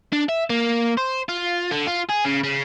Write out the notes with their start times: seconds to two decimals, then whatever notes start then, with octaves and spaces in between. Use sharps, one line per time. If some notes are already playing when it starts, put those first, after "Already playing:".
0.13 D4
0.29 E5
0.50 A#3
0.97 C5
1.29 F4
1.72 D3
1.87 F4
2.10 G#4
2.25 C#3
2.44 C#3